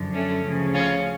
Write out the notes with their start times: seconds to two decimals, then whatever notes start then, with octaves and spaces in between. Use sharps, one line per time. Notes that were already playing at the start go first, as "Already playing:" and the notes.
Already playing: F#2 D3 F3
0.13 A3 C#4
0.44 D2 C#3 F3
0.75 C#4 F4